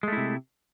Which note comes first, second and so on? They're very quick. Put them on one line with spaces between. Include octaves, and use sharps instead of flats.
G#3 A3 E4 C3